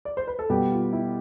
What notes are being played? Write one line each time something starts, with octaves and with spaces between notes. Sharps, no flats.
D5
C5
B4
A4
B2 G3 B3 G4
F4
E4